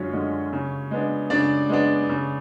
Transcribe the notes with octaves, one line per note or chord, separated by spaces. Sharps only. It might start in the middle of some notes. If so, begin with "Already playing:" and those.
Already playing: F#2 D3 G#3 C#4 F4 C#5
D3 G#3
C#3
G#3 B3 D4
C#3 D4 D5
G#3 B3 D4
C#3